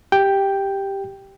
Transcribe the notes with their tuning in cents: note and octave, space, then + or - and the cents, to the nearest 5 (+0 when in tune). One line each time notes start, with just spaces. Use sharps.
G4 +0 G5 +0